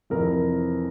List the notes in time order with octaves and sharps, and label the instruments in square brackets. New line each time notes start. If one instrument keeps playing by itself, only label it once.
[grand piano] F2 C3 E3 A#4